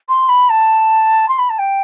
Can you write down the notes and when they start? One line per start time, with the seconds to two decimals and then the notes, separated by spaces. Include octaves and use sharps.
0.09 C6
0.29 B5
0.49 A5
1.28 C6
1.38 B5
1.49 A5
1.59 G5